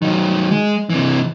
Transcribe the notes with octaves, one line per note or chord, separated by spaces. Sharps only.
D#3 F#3
G#3
C3 E3